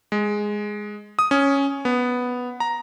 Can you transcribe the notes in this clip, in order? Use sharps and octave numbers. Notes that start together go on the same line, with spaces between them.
G#3
D#6
C#4
B3
A#5